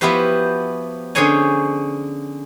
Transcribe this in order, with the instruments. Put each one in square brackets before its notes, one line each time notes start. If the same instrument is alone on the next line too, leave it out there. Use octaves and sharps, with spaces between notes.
[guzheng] F3 B3 E4 F#4 G4 C5
D3 C#4 G#4 C5 C#5 G#5